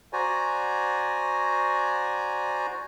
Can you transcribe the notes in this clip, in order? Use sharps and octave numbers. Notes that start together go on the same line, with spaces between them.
F#4 C5 D5 G#5 A#5